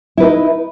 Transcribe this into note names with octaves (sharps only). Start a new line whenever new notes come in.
D#4 E4 B4